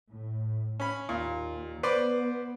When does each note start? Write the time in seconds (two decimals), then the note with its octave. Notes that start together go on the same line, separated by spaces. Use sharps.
0.11 A2
0.80 C#4 B5
1.09 D#2 A#2
1.83 B3 B4 C5 D5